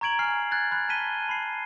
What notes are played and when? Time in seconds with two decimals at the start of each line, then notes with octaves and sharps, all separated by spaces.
0.01 A#5 C#6 G#6 D7 F#7
0.19 G#5 F6 C7
0.51 F#6 G#6 A6
0.71 B5 F#6
0.89 A5 F#6 B6 D#7 G7
1.29 B5 C7